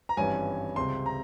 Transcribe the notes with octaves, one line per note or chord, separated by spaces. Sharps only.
A#5
G#1 G2 E3 G3 C#4 G#5
C#2 C3 G3 C6
A#5